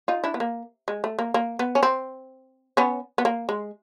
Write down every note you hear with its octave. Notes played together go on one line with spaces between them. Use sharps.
D#4 F4
D4 E4
B3
A#3
G#3
A3
A#3
A#3
B3
C#4
C4
B3 C#4
B3
A#3
G#3